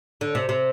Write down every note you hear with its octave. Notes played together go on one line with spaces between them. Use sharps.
D3
C3
C3